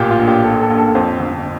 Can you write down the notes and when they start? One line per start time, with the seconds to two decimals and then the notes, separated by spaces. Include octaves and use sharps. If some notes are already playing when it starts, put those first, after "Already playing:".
Already playing: A1 A#2 G4
0.11 F4
0.19 A#1
0.28 G4
0.44 A#2 A4
0.61 A4
0.70 A#1
0.78 A4
0.95 F2 C5
1.20 G1